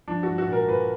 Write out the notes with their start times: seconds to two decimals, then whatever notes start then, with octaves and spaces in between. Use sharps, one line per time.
0.08 F3 D4
0.23 F3 F#4
0.38 F#4
0.48 A#2 A#4
0.68 A#2 B4